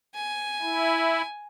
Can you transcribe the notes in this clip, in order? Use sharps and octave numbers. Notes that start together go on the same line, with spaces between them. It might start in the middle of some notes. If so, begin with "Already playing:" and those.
G#5
E4